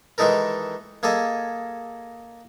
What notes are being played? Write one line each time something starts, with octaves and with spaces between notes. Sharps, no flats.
D#3 E3 G#3 D#4 A4 A#4
A#3 G#4 A4 D#5 G#5